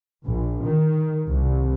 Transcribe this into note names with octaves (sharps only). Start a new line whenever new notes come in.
A#1
D#3
C2